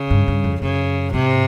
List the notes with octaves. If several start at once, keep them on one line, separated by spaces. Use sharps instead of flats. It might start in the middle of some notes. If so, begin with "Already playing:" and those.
Already playing: C#3
G2
G2
F2
F#2 C#3
G#2 C3